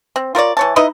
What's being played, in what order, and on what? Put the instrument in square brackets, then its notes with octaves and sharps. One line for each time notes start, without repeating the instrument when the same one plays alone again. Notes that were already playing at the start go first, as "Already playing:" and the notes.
[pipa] C4
F4 A#4 C#5 D5
E3 C#5 A5
D#4 E4 B4 D#5